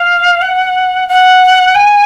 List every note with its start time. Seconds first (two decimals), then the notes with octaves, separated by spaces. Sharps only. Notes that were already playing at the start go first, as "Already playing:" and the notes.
Already playing: F5
0.42 F#5
1.09 F#5
1.75 G#5